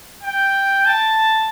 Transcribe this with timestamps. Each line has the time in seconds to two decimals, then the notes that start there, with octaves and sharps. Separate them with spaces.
0.23 G5
0.86 A5